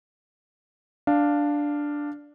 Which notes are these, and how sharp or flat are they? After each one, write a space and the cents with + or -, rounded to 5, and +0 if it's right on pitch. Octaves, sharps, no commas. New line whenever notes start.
D4 +0 F5 +0